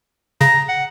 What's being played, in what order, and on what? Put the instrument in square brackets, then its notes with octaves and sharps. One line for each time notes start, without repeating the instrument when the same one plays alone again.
[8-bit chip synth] C#3 [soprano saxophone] A#5
[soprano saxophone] F#5